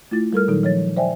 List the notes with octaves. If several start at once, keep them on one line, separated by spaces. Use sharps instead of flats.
A3 E4 F4 A6
G3 A4 A#4 F6
A#2 D#3 F#3 D#4 A4
F3 C#5 A6
C5 D5 E5 G5 G#5